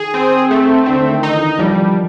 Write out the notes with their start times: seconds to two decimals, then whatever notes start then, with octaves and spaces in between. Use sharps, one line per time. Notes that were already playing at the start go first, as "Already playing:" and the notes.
Already playing: D#3 G#4
0.14 C4
0.51 A3
0.86 D3 C4
1.11 D#3
1.23 D#4
1.34 E3
1.58 F3 G3